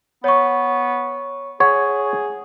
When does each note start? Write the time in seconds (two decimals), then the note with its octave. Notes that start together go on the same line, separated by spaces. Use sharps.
0.24 B3 C#5 C#6
1.60 G#4 C#5 F#5